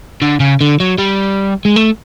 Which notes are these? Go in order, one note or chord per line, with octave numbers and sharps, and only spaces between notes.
D3
C#3
D3
F#3
G3
G#3
A3